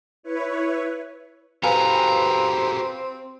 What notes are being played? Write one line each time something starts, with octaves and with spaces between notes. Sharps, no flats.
E4 B4 C#5
C4 F#4 G4 A4 B4 F5 G#5 A#5